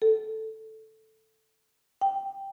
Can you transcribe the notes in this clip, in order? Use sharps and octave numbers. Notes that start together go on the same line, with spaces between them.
A4
G5